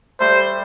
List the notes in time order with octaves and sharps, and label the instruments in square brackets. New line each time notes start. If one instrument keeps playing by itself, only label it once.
[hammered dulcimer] G3 A3 [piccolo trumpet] C5